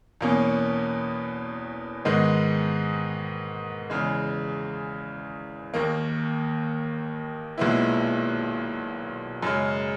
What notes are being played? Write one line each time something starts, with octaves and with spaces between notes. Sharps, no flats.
E2 B2 A#3 C#4
G#2 D#3 G#3 B3 D#4
E2 C#3 G#3
D#2 D#3 A#3
B1 A#2 G#3 B3 E4
F#2 C#3 G#3